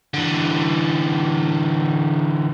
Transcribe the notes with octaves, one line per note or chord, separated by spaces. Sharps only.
D3 E3